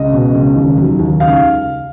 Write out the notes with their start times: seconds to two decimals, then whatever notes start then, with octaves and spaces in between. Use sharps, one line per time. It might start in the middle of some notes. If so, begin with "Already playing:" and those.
Already playing: C#2 D#5
0.13 B2
0.35 C#2
0.55 D#2
0.77 F#3
0.99 D#2
1.20 C#2 F5